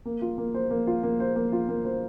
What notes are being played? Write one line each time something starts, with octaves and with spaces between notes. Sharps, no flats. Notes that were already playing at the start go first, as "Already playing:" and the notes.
A#3
F4
A#3
C5
A#3
F4
A#3
C5
A#3
F4
A#3
C5